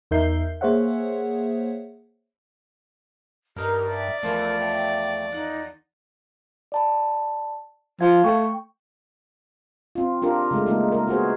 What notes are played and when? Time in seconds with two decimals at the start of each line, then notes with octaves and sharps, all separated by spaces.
0.11 E2 D#4 A#4 E5 G6 C7
0.61 A#3 G#4 C5 C#5 E5 F#5
3.56 G2 D#4 G4 A#4
3.89 D5 E5
4.23 E2 F3 A3 A#4
4.60 G5
5.32 D#4 F#5
6.72 D5 A5 B5
8.01 F3 F5 G#6
8.24 A3 G5 C#6
9.95 C4 F4
10.22 D4 F4 G4 A#4
10.51 C#3 G#3 A3
10.67 G3 G#3 A#3 D#4
10.92 A#4
11.07 B3 F#4 G#4 C5